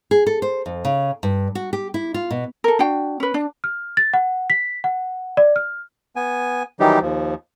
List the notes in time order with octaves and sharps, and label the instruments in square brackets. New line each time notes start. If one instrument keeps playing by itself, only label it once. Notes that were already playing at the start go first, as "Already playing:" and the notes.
[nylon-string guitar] G#4
A4
C5
F2
C#3
G2
F#4
G4
E4
F4
B2
[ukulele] A4 A#4
D4 F#4 G5
C#4 B4
D4
[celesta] F6
A6
F#5
B6
F#5
D5
F6
[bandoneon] B3 G#5
D#3 E3 F#3 G3 D#4 G4
D#2 F3